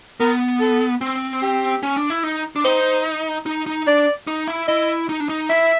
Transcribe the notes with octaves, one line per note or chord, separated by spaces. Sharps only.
B3 A#4
A4
C4
G4
C#4
D4
E4
D#4
D4
D#4 C5
D#4
D#4
D4 D5
D#4
E4
E4 D#5
D#4
D4
D#4
E4 E5